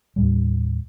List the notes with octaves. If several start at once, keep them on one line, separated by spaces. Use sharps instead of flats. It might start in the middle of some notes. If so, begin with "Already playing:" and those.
D#2 A2 G3